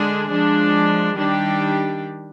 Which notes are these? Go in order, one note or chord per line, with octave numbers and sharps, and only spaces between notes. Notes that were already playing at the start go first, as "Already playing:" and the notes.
Already playing: D3 G#3 D4 G#4
F3 G#3 D4
D#3 G3 D4 G4